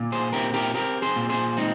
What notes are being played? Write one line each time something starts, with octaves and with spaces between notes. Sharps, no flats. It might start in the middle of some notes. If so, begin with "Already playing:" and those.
Already playing: A#2
G#4 C5
C4 G4 A#4
G4 A#4
C4 G4 A#4
G#4 C5
A#2
G#4 C5
G#3 C4 D#4